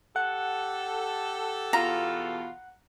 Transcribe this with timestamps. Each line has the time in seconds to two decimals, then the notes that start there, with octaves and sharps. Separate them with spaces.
0.16 G4 A4 F#5
1.73 E2 B2 F4 A#5